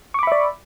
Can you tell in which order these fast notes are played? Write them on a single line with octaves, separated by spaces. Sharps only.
C#6 D6 B5 E5 D5